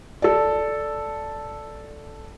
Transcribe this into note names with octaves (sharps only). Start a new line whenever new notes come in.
A4 D5